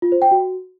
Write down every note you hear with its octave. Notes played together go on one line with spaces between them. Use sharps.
F4
C5
G5
F#4